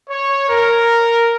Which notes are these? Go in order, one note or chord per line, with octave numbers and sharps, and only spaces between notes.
C#5
A#4